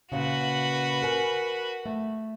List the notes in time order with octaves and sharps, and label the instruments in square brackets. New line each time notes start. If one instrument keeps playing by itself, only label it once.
[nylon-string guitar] A#2 C#3 [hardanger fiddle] F#4 B4
[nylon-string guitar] A#4 G#5
A3